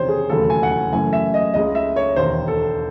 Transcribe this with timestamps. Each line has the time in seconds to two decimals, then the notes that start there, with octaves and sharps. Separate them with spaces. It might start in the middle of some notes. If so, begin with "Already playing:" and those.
Already playing: F#1 E2 C3 D#3 C5 C#5
0.09 G#4
0.30 E1 D#2 C#3 F#3 A3 A4
0.50 G#5
0.63 F#5
0.72 G#5
0.92 F#1 F#2 E3 A3 G#5
1.13 E5
1.34 D#5
1.54 C#2 C#3 G#3 D#5
1.75 E5
1.96 C#5
2.16 E1 D#2 D#3 C5
2.48 A4